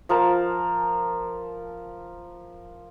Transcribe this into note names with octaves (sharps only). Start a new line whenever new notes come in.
F3 A#4 A5